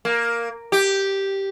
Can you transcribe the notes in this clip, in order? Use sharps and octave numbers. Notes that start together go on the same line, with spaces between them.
A#3
G4